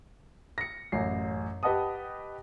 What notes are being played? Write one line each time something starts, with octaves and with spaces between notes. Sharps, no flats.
A#6 C#7
A1 F#2 C7
G4 B4 D#5 F#5 A5 D#6